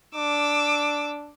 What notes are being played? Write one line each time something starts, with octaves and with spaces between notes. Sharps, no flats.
D4 D6 E6